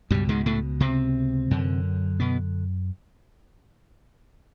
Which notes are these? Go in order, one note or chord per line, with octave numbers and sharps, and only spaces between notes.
C#2 G2 B2 G3
G#2 G#3
A2 A3
C3 C4
F#2 D3
B2 B3